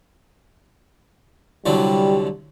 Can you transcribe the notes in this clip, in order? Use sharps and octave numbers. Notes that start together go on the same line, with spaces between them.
C2 D3 F#3 G3